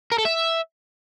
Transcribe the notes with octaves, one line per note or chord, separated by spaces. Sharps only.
A#4
A4
E5